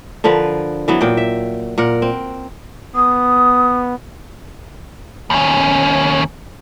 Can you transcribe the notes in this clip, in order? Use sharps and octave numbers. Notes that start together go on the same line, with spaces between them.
D3 F3 A#4 B4
E3 F#3 B3
A#2 F#3 G5
E5
A#2 A#4 F#5
C4
B3 D#6
D#2 C#4